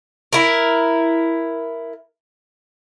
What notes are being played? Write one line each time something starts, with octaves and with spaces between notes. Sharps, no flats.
E4 A#4